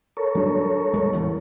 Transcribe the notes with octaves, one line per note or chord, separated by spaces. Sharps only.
A4 A#4 C#5
F#3 G3 D4
A#1 G3 G#3
E2 A2 C#3